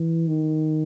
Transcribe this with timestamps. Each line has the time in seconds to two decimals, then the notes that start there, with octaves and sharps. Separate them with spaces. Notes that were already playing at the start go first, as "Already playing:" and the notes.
Already playing: E3
0.27 D#3